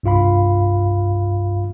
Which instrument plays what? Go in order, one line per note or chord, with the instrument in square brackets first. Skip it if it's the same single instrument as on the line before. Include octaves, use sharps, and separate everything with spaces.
[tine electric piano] C2 G2 F4 F5 B5